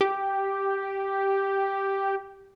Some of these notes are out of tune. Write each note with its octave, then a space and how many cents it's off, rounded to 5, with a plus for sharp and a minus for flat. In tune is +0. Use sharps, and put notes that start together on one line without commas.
G4 +0